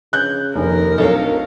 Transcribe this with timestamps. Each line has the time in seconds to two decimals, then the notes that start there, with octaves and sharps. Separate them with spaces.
0.13 C#3 F#6 G6
0.55 F1 D#2 A#4
0.98 D1 B1 A4 C#5 F5